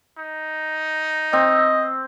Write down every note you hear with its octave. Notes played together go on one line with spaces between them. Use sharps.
D#4
C4 D#5